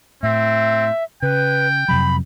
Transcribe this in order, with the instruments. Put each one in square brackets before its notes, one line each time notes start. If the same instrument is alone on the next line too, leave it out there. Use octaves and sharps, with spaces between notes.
[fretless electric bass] A2 [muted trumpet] C4 [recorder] E5
[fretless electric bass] C#3 [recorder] B4 [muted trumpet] G5
[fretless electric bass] F2 C3 F#3 [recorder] B5